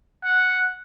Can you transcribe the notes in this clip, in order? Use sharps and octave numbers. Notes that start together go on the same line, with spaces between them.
F#5